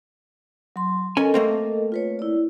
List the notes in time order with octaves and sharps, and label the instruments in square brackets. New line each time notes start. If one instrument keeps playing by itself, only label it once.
[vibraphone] F#3 C6
[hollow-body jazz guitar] C#4 G#5 [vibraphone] A4 A#4 D#5
[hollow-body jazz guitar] A3 A#3 C4
[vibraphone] F4 B4 C#5
E4 D5